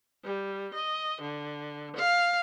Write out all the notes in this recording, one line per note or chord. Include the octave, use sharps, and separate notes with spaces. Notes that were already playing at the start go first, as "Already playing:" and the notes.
G3
D#5
D3
F5